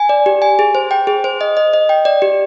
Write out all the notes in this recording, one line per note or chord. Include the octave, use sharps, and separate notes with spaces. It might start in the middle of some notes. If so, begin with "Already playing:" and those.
Already playing: G#5
D5
G4
G#5
G#4
C5
G5
G#4
C5
D#5
D#5
D#5
G5
D5
G4